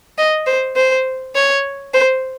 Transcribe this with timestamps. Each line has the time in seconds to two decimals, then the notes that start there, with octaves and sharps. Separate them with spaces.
0.18 D#5
0.46 C5
0.76 C5
1.35 C#5
1.94 C5